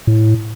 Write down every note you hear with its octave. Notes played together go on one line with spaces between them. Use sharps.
A2